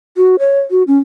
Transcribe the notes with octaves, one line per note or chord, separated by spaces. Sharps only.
F#4
C#5
F#4
C#4